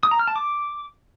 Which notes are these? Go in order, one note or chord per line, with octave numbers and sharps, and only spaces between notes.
D#6
A#5
F6
A5
D6